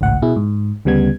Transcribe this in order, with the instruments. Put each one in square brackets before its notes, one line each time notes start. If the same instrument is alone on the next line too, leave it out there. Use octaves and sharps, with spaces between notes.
[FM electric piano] G#1 C#2 A2 F#5
B2 E4 G#4
G#2
D2 C#3 G3 B3 G#6